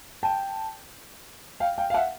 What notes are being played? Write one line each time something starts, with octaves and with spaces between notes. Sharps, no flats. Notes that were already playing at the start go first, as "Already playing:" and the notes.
G5 A5
F5 G5
F5 G5
F5
E5 F#5